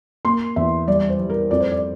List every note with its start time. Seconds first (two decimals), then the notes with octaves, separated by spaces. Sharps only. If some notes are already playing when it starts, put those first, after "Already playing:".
0.25 A#3 C6
0.56 E2 E5
0.87 G3 D5
1.09 C5
1.20 G3
1.30 A#4
1.50 F2 D5
1.60 C5
1.71 D5